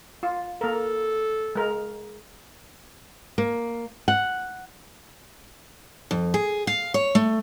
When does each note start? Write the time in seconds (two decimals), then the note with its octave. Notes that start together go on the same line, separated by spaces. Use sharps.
0.23 F4
0.61 A#3 A4 A#4
1.55 G#3 A#4
3.38 A#3
4.08 F#5
6.11 F2
6.34 G#4
6.67 F5
6.94 C#5
7.15 A3